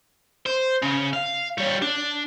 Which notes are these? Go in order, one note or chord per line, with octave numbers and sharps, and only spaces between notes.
C5
C#3
F5
G3 C#5
D4